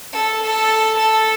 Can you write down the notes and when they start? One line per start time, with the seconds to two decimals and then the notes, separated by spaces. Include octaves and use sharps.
0.13 A4
0.42 A4
0.98 A4